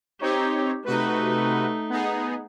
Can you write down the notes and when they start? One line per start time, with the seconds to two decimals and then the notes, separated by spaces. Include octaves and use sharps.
0.21 C4 D#4 G4 C#5
0.85 C3 A3 D#4 F#4 B4
1.90 B3 D#4 G#4